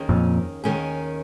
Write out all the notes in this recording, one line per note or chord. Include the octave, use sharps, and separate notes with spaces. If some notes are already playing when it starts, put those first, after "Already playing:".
Already playing: D#2 D#3 A#3 C#4 G#4
F2 A#2
D#2 D#3 A#3 C#4 G#4